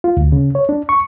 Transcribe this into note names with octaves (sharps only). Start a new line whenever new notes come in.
F4
D2
C#3
C#5
D4
C#6